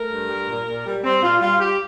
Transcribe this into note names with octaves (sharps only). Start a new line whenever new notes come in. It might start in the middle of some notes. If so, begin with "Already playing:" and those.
Already playing: A3 A#4
G2
G3
A#2
A#2
G3
G3 C4
A#2 F4
G3 F4
G3 G4